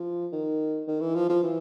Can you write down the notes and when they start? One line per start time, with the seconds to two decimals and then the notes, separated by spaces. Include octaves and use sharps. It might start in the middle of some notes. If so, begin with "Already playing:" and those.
Already playing: F3
0.32 D#3
0.87 D#3
1.01 E3
1.15 F3
1.29 F3
1.43 E3